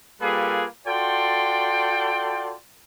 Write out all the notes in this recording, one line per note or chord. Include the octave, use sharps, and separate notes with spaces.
G3 A#3 F4 G#4 A4 B4
F4 F#4 A4 D5 G5 C6